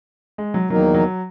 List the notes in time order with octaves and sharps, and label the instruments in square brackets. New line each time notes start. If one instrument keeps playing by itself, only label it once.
[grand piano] G#3
F#3
[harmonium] E2 D#3 A#3 D#4 A#4 [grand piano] F#3
[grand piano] F#3